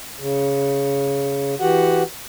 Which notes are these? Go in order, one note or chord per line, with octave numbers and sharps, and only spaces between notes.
C#3
E3 F#4 G4 F#5